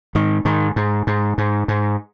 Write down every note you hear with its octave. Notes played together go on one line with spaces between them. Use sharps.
G#2 D#3
G#2 D#3
G#2
G#2
G#2
G#2